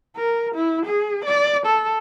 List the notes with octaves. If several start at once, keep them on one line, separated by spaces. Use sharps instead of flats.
A#4
E4
G#4
D5
A4